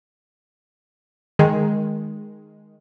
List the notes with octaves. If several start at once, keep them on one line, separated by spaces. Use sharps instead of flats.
D#3 G#3